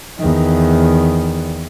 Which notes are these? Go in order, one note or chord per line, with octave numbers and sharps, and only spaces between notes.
E2 D#3